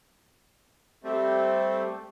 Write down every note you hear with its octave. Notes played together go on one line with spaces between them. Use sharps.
G3 A3 C4